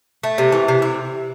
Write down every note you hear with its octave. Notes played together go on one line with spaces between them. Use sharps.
A3
C3
E3
C3
E4